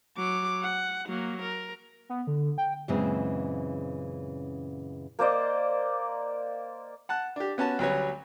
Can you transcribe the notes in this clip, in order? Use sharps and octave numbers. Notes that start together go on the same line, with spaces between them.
F#3 D6
F#5
F#3 A#3
A#4
B3
D3
G5
F#2 A#2 C#3 E3 G#3 C4
A#3 C5 D5 D#5
F#5 A5 F#6
D4 G4
B3 C#4 F#4 A5
D2 F#3 G3 B4 C#5